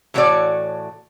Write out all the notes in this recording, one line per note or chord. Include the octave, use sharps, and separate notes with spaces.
A2 E3 A3 F#4 C#5 D5